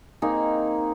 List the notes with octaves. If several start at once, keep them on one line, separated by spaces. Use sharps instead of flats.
A#3 C4 D#4 G#4